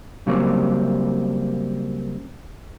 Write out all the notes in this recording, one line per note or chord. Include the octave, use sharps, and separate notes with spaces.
C#3 F#3 G3 A#3 C4